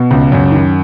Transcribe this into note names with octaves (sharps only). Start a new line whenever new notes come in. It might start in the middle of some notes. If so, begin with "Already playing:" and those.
Already playing: B2
C#2
F#2
D#3